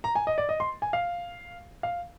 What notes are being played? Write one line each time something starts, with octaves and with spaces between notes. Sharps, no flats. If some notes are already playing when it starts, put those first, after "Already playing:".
A#5
G#5
D#5
D5
D#5
C6
G#5
F5
F5